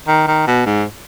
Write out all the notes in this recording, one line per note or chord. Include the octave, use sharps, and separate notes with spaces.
D#3
D#3
B2
G#2